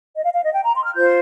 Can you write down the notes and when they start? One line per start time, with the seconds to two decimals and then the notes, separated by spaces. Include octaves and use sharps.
0.17 D#5
0.23 F5
0.34 F5
0.44 D#5
0.54 G5
0.64 A#5
0.75 C6
0.85 F6
0.95 F4 C5 G6